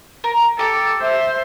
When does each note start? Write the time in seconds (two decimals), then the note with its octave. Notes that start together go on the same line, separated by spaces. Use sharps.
0.24 A#4
0.59 G4 A4 D6
1.02 C5 E5